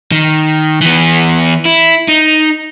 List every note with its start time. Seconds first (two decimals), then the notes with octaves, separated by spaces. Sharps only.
0.12 D#3
0.81 E3 B3
1.65 E4
2.08 D#4